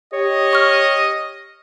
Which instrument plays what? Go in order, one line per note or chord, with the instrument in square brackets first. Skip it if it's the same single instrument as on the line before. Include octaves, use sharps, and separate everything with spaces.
[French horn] G4 [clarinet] C#5 [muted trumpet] D#5
[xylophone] C#6 F6